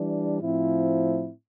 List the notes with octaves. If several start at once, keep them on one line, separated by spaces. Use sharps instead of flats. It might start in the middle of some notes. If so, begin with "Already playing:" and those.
Already playing: E3 G3 D4
A2 F3 C4 E4